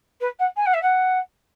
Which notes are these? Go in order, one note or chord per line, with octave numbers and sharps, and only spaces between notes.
B4
F#5
G#5
F#5
E5
F#5